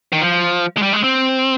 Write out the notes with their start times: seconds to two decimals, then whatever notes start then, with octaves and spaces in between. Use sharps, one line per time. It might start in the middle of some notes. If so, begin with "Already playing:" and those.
0.12 D#3
0.21 F3
0.77 G#3
0.82 G3
0.93 G#3
1.04 C4